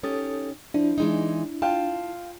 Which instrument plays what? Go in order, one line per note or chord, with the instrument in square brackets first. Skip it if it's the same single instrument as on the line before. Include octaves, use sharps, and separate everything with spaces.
[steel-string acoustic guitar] C#4 D#4 G4 [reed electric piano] A4 D#6 A6
[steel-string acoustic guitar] F3 [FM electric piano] D4 [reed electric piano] E4
[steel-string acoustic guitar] E3 G#3 D#4
[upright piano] F4 F5 G5 [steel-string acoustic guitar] A5